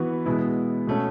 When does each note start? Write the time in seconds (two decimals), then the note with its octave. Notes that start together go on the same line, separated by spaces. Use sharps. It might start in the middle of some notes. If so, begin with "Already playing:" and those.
Already playing: E3 B3 F#4
0.26 B2 G#3 B3 E4
0.87 B2 A3 C#4